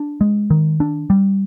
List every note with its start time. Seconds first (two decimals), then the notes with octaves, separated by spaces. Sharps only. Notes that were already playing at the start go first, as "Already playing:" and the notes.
Already playing: D4
0.21 G#3
0.50 D#3
0.80 D4
1.10 G3